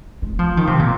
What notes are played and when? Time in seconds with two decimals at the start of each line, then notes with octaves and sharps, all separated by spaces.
0.22 G#3
0.39 F3
0.57 D#3
0.67 C3
0.79 A#2